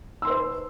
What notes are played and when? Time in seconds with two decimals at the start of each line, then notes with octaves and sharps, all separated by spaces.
0.22 E6
0.25 C6
0.27 B4
0.30 C5